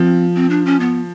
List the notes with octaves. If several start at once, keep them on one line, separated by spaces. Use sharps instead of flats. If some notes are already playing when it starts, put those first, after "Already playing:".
Already playing: F3 C4
C4
D4
C#4
B3